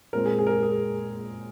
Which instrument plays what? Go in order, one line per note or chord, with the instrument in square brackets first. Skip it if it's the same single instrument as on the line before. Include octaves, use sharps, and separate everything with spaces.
[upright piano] A#2 G#3 C4 A#4
G#4
G#4
A#4
G#4
G#4